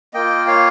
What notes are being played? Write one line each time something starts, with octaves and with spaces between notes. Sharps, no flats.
A#3 F4 D#5 G5
C#5 F5